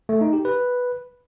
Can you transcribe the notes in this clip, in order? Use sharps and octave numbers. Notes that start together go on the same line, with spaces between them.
A3
D#4
G4
B4